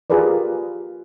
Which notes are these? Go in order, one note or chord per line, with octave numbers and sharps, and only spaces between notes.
F4 G4 G#4 A#4 B4 D5